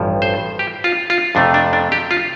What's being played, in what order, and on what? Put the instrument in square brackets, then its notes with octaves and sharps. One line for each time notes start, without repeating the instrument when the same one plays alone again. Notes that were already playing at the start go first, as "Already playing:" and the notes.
Already playing: [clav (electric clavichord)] A1 G2 F3
C5
G4
F4
F4
F2 C3 A3 D4
D4
D4
G4
F4